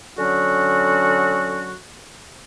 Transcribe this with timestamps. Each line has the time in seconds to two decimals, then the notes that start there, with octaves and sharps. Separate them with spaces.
0.18 D3 F#3 C#4 F#4